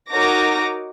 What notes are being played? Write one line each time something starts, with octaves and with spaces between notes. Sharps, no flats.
D#4 F#4 A#4 C#5 D6 A#6